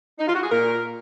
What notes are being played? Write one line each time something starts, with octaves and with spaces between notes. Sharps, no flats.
D#4
F4
F#4
G#4
A#2 A#4